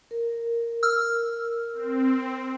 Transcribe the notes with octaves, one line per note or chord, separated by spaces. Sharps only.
A#4
E6 F6
C4